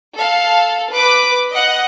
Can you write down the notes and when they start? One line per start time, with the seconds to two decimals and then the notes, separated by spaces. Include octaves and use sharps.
0.15 A4 F5
0.93 B4 D6
1.53 D#5 F#5